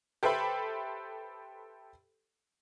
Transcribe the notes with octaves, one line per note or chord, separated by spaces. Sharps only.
G4 A4 B4 C5 E5 B5